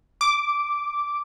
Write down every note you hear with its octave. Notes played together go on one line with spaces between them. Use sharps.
D6